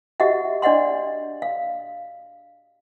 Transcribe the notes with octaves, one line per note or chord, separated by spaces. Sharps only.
F#4 G4 D#5 E5 F#5
D4 D5 D#5 F#5 C6
F5